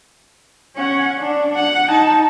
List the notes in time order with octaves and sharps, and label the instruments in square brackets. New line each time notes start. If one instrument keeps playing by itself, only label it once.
[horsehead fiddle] C#4 F#5
D4
F#5
D#4 A5